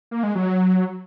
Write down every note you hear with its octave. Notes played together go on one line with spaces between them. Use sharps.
A#3
G#3
F#3